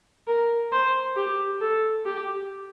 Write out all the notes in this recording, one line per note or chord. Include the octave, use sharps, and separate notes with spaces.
A#4
C5
G4
A4
G4